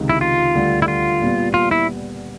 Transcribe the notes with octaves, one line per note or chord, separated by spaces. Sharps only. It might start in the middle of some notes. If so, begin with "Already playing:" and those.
Already playing: C#2 C3 D#3
E4
F4
D2 D3 G3
E4
F4
A#2 G3 B3
F4
E4